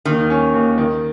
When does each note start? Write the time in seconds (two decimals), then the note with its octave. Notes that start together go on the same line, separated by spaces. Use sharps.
0.05 D#2 D#3
0.30 C#4
0.54 D#2
0.78 D#3